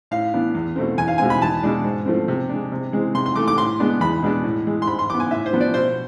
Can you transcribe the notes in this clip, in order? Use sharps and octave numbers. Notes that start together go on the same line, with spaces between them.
A2 F5
E3 B3 D4
E2
B2 A3 C4
E2 G#5
F5
B2 G#3 C4 G#5
B5
E2 A5
B2 G#3 D4
G#2
F3 A3 C4
C3
G#3 D4
C3
E3 G#3 C4
C3 C6
C6
E3 A3 D6
D6
A2 C6
G#3 B3 D4
E2 B5
B2 G#3 B3 D4
A2
E3 G#3
C6
G#2 B5
C6
E3 B3 D6
G#5
A2 E5
C5
F3 B3 D4
D5
B2 C5